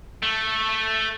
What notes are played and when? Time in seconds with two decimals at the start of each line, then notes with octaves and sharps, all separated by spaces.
0.23 A3